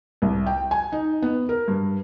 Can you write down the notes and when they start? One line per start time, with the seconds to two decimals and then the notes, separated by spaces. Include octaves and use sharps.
0.22 C2
0.47 G5
0.71 G#5
0.92 D#4
1.22 B3
1.49 A#4
1.68 G2